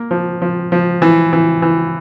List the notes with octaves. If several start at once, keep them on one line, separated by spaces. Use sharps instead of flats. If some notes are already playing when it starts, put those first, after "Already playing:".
Already playing: A#3
F3
F3
F3
E3
E3
E3